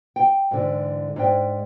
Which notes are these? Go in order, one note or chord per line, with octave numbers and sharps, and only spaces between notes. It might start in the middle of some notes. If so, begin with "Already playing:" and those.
G5
G#2 D3 E3
G#2 D4 G5